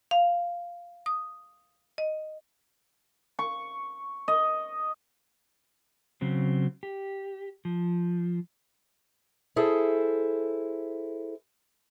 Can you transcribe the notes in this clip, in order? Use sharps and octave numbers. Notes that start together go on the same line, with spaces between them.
F5
D#6
D#5
C#6
D#5
C#3 F#3 C4
G4
F3
E4 G#4 A4 C5